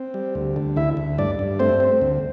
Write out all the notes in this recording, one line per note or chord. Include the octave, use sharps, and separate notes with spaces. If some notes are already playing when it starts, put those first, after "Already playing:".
Already playing: C4
G3
D2
D3
D2 E4 E5
D2
G2 D4 D5
G2
A3 C4 C5
C4
D2